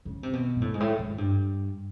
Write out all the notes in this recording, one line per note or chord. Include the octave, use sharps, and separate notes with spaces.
C#3
C3
B2
A#2
A2
G#2
A2
G#2
G2